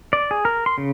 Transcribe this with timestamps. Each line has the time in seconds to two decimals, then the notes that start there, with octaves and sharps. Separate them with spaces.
0.13 D5
0.31 G#4
0.45 A#4
0.66 C6
0.78 C#3